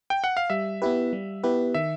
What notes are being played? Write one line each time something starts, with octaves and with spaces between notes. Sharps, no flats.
G5
F#5
F5
G3 E5
B3 E4 G4 B4
G3
B3 E4 G4 B4
D#3 E5